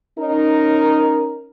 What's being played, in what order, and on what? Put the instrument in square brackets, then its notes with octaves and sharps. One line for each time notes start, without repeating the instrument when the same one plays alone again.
[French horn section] C#4 D#4 A#4